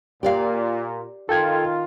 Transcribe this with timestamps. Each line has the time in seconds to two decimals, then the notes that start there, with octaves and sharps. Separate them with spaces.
0.23 A#2 G4 D5 F5
1.29 D#3 F4 A4 G5 G#6